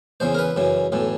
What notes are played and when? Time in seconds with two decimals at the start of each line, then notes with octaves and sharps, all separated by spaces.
0.20 E2 C#3 E3 C5
0.34 A#4
0.39 B4
0.56 F#2 C#3 E3
0.92 B1 A2 E3